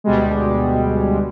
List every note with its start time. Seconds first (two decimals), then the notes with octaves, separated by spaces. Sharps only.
0.04 D2 B2 G3 G#3